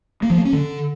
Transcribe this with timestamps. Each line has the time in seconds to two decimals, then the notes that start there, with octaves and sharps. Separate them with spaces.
0.22 A#3
0.30 F3
0.38 A#3
0.45 C#4
0.53 D3